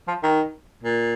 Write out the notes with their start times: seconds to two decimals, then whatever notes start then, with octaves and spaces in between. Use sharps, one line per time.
0.08 F3
0.23 D#3
0.83 A#2